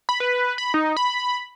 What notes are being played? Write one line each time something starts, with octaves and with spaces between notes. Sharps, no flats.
B5
B4
B5
D#4
B5